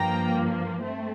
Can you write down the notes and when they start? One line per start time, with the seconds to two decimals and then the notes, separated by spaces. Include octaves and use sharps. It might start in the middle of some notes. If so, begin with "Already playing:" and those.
Already playing: G2 F3 A#3 G5 A#5
0.83 A3 C4